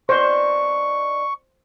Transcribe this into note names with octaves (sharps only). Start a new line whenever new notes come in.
B3 D4 D#4 C5 C#6